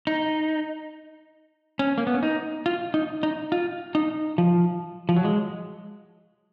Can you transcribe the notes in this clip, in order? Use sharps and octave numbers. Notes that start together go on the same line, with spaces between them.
D#4
C#4
A#3
B3
C#4
D#4
F4
D#4
D#4
F4
D#4
F3
F3
F#3
G#3